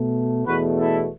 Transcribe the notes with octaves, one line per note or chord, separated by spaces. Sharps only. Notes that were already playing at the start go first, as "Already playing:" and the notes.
Already playing: B2 A3
E2 B2 A3 F#4 B4
E4 A4